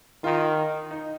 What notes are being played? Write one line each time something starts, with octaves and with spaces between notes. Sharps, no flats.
D#3 F4
D#4